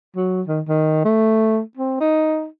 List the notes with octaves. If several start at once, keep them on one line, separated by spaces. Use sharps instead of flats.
F#3
D#3
D#3
A3
C4
D#4